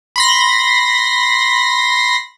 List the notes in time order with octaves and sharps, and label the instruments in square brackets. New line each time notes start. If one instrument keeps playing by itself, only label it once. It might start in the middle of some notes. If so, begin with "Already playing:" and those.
[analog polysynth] B5 C6 A#6